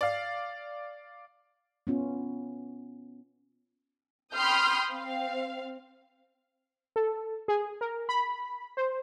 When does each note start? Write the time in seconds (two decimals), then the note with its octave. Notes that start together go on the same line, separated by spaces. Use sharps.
0.01 D5 F5
1.87 B3 C#4 F4
4.34 G5 B5 C6 D#6 F6 G6
4.93 C4 F5
6.96 A4
7.48 G#4
7.81 A#4
8.09 B5
8.77 C5